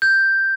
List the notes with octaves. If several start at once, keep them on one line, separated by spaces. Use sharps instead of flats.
G6